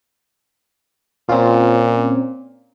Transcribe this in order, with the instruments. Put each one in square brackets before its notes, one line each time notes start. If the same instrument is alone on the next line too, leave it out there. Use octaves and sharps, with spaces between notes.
[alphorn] A#2 [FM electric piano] C4 C#4 F4